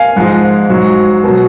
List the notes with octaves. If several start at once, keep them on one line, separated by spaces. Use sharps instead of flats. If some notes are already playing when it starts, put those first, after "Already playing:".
Already playing: F5 G#5
G#2 F3 G#3
G#2 F#3
B2 F#3